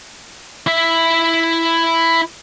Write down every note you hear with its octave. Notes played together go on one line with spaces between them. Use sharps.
E4 E5